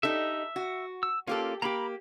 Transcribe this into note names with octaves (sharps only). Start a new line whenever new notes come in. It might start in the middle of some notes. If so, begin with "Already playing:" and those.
D#4 G4 A4 E5
F#4
E6
A#3 C#4 F4 G4 A4 F5
A#3 G4 A#5 B5 D6